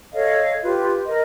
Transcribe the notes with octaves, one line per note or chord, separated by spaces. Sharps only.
A4 C#5 D#5 F5
F4 G4 B4
A#4 D#5